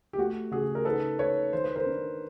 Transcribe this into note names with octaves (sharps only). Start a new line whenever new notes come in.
G4
A3 F#4
C#3 F#4 G#4
A#4
D#4 A4 B4
D#4 B4 C#5
D#3 C5
B4
A#4 C5
D4